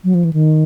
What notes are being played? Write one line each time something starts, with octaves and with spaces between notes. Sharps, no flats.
F#3
F3
E3
D#3